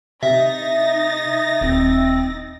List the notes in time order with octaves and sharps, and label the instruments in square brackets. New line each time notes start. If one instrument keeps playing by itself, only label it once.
[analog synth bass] C3 [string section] D#4 A6 A#6 [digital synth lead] E5
[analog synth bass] D#1 [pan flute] C4